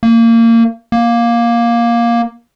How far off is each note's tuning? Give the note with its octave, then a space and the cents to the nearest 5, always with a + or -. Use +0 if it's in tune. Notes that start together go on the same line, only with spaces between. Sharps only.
A#3 -25
A#3 +10